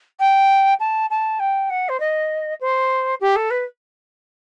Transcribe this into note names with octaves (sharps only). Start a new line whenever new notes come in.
G5
A5
A5
G5
F#5
C5
D#5
C5
G4
A4
B4